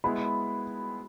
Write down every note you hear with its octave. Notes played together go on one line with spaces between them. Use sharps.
G#3 B3 E4 B5